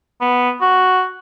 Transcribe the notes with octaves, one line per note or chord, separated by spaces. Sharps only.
B3
F#4